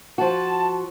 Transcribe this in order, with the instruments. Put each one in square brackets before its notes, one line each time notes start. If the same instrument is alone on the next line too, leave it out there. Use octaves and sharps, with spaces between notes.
[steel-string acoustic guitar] F3 F#4 [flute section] A5